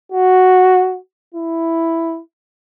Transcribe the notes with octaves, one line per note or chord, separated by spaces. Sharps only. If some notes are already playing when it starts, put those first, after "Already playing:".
F#4
E4